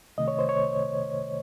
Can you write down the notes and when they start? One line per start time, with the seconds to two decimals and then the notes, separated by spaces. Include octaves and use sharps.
0.18 C2 C3 D#3 A3 D#5
0.28 C#5
0.39 C5
0.49 C#5